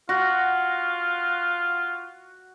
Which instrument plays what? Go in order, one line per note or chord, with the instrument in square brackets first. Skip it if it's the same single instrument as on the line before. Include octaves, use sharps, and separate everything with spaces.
[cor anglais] F4 [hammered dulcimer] F#4